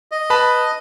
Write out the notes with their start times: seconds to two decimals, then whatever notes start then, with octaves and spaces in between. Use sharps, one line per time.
0.12 D#5
0.30 B4 A5 B5